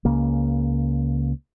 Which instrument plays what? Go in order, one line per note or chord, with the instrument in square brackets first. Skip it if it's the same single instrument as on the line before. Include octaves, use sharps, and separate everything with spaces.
[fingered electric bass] C#2 C#3 A#3